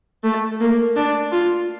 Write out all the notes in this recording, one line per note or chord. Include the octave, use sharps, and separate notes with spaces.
A3
A#3
D4
F4